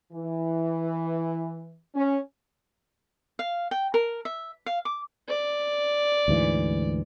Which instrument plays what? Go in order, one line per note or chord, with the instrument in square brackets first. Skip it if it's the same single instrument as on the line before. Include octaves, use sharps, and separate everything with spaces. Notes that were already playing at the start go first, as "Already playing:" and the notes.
[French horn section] E3
C#4
[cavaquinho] F5
G5
A#4
E5
F5
D6
[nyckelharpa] D5
[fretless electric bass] D2 G#2 E3